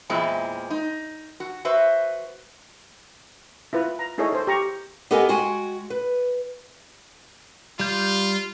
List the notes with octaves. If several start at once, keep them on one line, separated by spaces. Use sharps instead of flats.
E2 A#2 G#3 C4 E4
D#4
F#4
F#4 B4 C5 E5
E4 F4 B4
A#5
D#4 E4 G#4 A4 C#5 D#5
A4 C5
G4 A#5 C#6
B3 G4 A4 A#4 D#5 G#5
G#3 F#4 G5 G#5
B4
G3 F4 G6